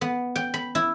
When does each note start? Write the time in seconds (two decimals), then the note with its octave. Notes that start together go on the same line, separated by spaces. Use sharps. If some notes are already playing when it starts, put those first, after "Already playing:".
0.01 B3
0.36 G5
0.54 B5
0.75 E4